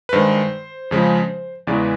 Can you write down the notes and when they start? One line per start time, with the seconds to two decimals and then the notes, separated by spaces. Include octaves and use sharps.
0.09 B4
0.13 G2 D#3 G#3 C5
0.91 F2 C#3 F3 G#3
1.67 E2 C#3 E3 G#3 D5